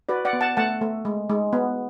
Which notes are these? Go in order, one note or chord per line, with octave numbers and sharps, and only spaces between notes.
F#4 B4 D5
D5 F#5
B3
F#5 A5
A3 F#5 A5
A3
G#3
G#3
B3